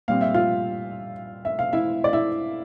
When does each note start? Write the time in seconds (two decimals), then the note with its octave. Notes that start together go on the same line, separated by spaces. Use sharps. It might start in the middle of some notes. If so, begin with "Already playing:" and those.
0.08 A#2 G3 C4 F5
0.21 E5
0.34 F4 F5
1.45 E5
1.59 F5
1.73 E4 E5
2.04 D5
2.13 E4 E5